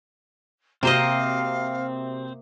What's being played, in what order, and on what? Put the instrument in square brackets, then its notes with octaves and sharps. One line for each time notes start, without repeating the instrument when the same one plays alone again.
[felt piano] C3 F#4 E7 [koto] A#3 C5 D#5 [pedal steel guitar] C4 [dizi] F5